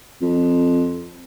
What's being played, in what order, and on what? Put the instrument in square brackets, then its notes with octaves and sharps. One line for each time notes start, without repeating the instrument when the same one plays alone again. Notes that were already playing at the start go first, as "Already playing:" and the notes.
[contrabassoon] F2